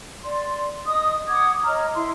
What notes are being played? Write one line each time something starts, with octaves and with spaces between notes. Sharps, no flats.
D5 C6
D#5 D#6
F#5 D6 D#6 G#6
C#5 D#5 A#5 F6
E4 C6